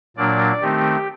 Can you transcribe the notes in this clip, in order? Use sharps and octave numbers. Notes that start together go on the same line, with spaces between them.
A#2 F#3 A#3 D4 D5
D#3 A3 C4 D#4 G4